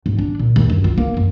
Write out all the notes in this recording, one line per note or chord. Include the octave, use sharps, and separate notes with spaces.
G#2
D4
A#2
D#2
F#2
F4
A#3
F#2